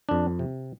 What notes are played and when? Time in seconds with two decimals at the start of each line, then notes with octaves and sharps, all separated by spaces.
0.09 F2 D4
0.39 C3